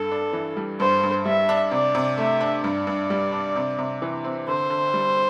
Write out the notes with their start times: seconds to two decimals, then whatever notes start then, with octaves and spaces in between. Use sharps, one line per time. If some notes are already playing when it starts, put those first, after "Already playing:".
Already playing: G2 A4
0.11 D4
0.33 E3
0.57 G3
0.80 G2 C5
1.03 G2
1.25 G3 E5
1.49 D4
1.71 C3 D5
1.95 C3
2.17 A3 E5
2.41 D4
2.63 G2 D5
2.87 G2
3.10 G3
3.32 D4
3.56 C3
3.78 C3
4.02 E3
4.24 C4
4.48 D3 C5
4.70 D3
4.94 G3